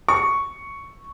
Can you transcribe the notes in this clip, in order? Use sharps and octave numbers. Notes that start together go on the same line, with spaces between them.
C#6